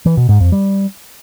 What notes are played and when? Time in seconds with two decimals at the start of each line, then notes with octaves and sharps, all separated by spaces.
0.06 E3
0.17 B2
0.29 G#2
0.41 F2
0.52 G3